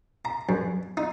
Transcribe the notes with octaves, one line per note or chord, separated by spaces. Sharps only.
A#5
F#2
D#4